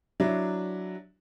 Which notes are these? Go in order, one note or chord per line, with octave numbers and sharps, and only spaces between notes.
F#3 D4 E4